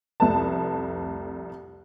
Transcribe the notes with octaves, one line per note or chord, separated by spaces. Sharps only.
C2 F2 A3 B4 A5